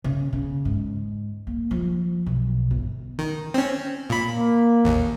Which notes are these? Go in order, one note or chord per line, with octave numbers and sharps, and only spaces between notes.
C#3
C#3
G#2
A#3
F3
B1
G1
D#3
C4 C#4
A#2 B5
A#3
A1 D#2